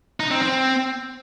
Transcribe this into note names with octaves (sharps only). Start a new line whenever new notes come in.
D#4
C4
C4